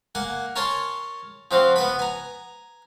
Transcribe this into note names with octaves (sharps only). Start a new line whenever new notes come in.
A#3 F#5 G#5
A#4 C#5 G#5 A5 C6 C#6
F3 C4 F#4 F5
B3 B4 B5
G#5 A#5